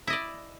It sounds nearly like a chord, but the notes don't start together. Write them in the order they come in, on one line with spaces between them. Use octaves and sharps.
E4 D#5 D5